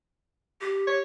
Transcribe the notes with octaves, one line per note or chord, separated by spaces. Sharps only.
G4
C#5